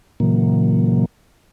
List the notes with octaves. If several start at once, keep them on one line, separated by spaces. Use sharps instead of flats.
A#2 C#3 E3 F#3 A#3